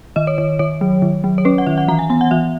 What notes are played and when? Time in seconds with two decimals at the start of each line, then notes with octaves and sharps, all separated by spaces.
0.16 D#3 D#5
0.27 C#5
0.38 D#3 C#5
0.59 D#3 C#5
0.81 F#3
1.02 D#3
1.24 F#3
1.38 C#5
1.45 C#4 B4
1.58 F#5
1.66 D#3 E5
1.78 F#5
1.88 E3 A#5
1.99 G#5
2.10 B3 G#5
2.21 F#5
2.31 E3 E5